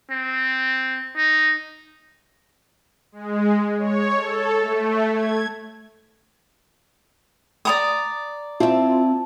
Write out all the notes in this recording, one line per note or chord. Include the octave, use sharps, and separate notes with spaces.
C4
D#4
G#3
C#5
A4
A3
G#6
D5 A#5 D#6
C4 E4 F4 E5 A5